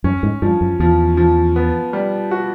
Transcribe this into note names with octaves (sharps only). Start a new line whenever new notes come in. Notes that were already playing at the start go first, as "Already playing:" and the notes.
F#2 C#4
G#2
G2 F3
F#2
E2 F3
F3
B3
G3
F#4